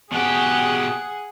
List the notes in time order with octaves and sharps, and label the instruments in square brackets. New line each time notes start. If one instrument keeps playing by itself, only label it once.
[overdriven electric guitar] B2 G4 [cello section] G#4 [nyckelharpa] F#5